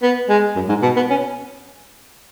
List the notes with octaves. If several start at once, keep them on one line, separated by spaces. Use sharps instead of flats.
B3
G#3
F#2
G#2
B2
B3
C#4